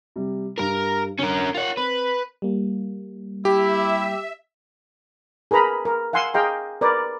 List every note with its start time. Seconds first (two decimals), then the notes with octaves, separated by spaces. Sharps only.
0.16 C3 G3
0.58 G2 G3 A#4 A#5
1.19 D3 C#4 A#4
1.55 F4 A#4 C#5 F#5
1.77 C4 B4
2.42 G3 A#3
3.45 E4 G4 E5
5.51 G#4 A#4 B4 A#5 B5
5.85 A#4
6.13 F5 F#5 G#5 C6 E6
6.34 G#4 D#5 F5 G5 A#5 C6
6.81 A#4 B4 D5